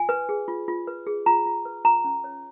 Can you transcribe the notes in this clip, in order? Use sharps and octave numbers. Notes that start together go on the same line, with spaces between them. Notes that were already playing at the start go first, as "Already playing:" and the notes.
Already playing: F4 G#5
B4
G#4
F4
F4
B4
G#4
F4 A#5
F4
B4
F4 A#5
C#4
C#5